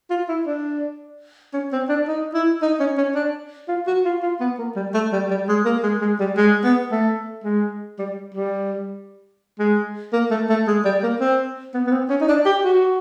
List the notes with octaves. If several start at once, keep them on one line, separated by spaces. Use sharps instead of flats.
F4
E4
D4
C#4
C4
D4
D#4
E4
D#4
C#4
C#4
D4
F4
F#4
F4
F4
B3
A#3
G3
A3
G3
G3
G#3
A#3
G#3
G#3
G3
G#3
B3
A3
G#3
G3
G3
G#3
A#3
A3
A3
G#3
G3
A#3
C4
B3
B3
C4
C#4
D#4
D4
G4
F#4